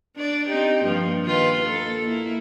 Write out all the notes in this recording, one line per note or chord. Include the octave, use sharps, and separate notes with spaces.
D4 D5
C4 D#4 G4
G2 F3 A#3
D#3 F4 B4
A#3 A4
A#3 E4